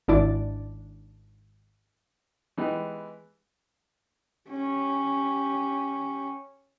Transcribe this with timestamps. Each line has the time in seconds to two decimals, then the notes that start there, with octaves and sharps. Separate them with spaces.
0.08 G#1 D4 E4 D5
2.57 E3 G#3 B3 D#4 G4
4.50 C#4 G4